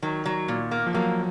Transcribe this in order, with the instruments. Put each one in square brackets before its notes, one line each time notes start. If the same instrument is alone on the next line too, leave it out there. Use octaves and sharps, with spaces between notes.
[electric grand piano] D#3 [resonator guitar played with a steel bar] F#3
[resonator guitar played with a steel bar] F#3
A#2
A#3
[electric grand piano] F3
[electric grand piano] F#3 [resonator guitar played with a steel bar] A#3